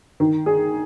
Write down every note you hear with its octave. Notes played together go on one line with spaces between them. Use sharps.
D#3
G#4